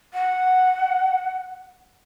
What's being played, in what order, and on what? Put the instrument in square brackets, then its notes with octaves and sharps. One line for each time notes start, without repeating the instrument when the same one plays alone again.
[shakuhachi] F#5